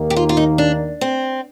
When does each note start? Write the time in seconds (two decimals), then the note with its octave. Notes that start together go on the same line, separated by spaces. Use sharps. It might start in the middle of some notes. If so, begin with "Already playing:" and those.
Already playing: D#2 D#3 A#3
0.10 G4
0.16 F4
0.29 F4
0.37 D#4
0.58 D4
1.01 C4